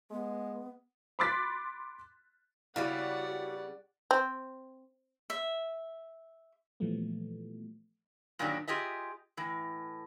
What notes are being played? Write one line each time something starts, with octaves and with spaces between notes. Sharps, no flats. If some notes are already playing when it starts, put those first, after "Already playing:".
G#3 B3
B5 C6 D6 F#6 A6 B6
C#3 G3 B3 E4 F#4 D5 F5 F#5
C4
E5
A#2 E3 F3 G3 A3 B3
G2 A#2 D#3 F#3 D4 G4
F4 G4 G#4 D#5 E5
A2 E3